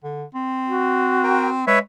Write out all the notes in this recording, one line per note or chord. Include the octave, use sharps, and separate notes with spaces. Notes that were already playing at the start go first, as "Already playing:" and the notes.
D3
C4
F#4
A#4 G5
G#3 B4 C#5 E5